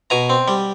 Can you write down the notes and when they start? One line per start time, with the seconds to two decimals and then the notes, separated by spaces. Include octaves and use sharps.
0.10 B2 G#5 A#5
0.30 C4
0.48 G3